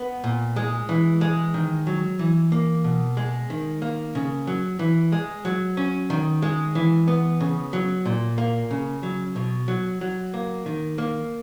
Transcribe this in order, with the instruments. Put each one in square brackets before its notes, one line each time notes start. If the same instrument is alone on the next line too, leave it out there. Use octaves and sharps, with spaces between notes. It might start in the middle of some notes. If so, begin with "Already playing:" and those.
Already playing: [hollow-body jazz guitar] B3
A#2
G#3
E3
G#3
D#3
F#3
E3
A#3
B2
G#3
D#3
A#3
C#3
F#3
E3
G#3
F#3
C#4
D#3
G#3
E3
B3
C#3
F#3
A#2
A#3
C#3
F#3
B2
F#3
F#3
A#3
D#3
A#3